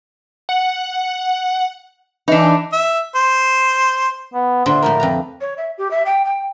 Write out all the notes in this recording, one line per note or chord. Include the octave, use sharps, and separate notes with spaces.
F#5
E3 D4 D#4
E5
C5
B3
A#2 D3 C5 E5
A2 F3 A3 A#4
F2 B4 A#5
C#5
E5
G4
E5
G5
G5